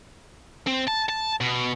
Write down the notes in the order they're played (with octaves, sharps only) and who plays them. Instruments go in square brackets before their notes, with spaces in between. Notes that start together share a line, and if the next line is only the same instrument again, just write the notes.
[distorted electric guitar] C4
A5
A5
B2